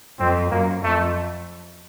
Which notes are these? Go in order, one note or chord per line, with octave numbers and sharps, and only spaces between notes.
F2 C4
F#2 A#3
F2 A3